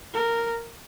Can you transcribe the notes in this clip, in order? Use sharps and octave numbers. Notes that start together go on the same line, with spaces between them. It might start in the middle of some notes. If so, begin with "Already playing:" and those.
A#4